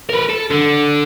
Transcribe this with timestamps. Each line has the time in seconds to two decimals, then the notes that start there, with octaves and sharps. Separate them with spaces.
0.10 A#4 B4
0.30 A4
0.51 D3